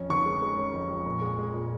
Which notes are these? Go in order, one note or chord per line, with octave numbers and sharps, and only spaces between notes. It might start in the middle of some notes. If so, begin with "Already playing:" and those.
Already playing: F2 C#4
D#3 C#6
G#3
G#3
C#4
F2
F2
A#2
G#3
G#3
A#2